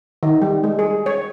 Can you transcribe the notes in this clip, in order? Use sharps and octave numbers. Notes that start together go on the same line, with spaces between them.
D#3
G3
G#3
G#4
C#5